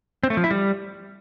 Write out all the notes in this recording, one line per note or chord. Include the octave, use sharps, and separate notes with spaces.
C4
A3
F3
E4
G3